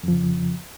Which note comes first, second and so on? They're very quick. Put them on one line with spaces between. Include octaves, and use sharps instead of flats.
F2 F3 C#3